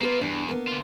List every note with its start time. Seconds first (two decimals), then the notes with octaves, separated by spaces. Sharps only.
0.01 A#3 B3 F4 G#4 B4
0.21 E2 G2 D4
0.49 A#3 B3
0.68 D3 F4